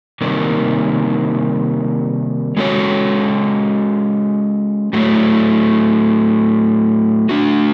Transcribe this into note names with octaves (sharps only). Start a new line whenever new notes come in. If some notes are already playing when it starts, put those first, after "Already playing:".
C3 D#3 G3 A#3
G#3 C#4 F#4 A4 C#5
A2 F#3 A3
A3 D4 F#4